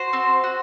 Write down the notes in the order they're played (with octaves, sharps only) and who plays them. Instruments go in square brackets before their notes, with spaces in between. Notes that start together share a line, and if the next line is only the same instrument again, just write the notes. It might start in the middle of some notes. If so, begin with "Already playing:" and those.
Already playing: [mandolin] F#4 C5
C4
F#4